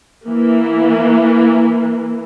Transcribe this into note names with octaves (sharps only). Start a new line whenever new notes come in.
E3 A#3